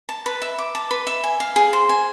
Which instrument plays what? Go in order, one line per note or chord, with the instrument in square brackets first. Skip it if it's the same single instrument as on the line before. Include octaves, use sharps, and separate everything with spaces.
[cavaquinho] A5
B4
E5
D6
A5
B4
E5
G#5
F5
G#4
C5
G#5